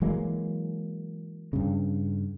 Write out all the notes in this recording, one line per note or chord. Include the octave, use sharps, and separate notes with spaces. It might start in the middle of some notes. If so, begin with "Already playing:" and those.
E3 F#3 G#3 A#3
G2 C#3